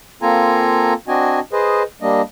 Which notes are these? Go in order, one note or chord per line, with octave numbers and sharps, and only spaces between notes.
A#3 C4 F4 A4 G#5 A#5
C4 D4 F#4 D#5 G#5
G#4 B4 C5 D#5
G3 A#3 D4 D#5